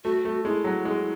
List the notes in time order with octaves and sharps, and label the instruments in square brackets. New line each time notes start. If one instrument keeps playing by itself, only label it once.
[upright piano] A3 [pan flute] F#4
[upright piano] A3
[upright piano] G#3 [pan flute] E4
[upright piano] F#3
G#3